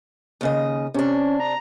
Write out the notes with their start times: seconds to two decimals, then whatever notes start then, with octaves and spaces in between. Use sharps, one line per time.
0.41 D#2 C#3 D#5
0.94 C3 C#4 D4
1.40 A#5